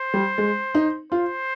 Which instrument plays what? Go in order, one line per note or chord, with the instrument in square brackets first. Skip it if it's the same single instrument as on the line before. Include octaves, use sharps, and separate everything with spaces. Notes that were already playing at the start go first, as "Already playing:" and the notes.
Already playing: [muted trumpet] C5
[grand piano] G3
G#3
D#4
[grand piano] F4 [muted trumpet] C5